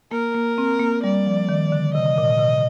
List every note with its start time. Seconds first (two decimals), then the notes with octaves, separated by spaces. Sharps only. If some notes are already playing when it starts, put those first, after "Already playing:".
0.11 A#3 A#4
0.35 A#3
0.58 C4
0.80 A#3
1.03 G3 D5
1.26 F3
1.49 D#3
1.72 D3
1.94 C3 D#5
2.18 A#2
2.40 C3